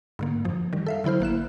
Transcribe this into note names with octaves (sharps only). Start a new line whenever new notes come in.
G#2 D3 A#3
F#2 F3
D#3 G3
A4 E5 F5
D3 F#3 E4 C5 F6
A1 A#3 F#6 E7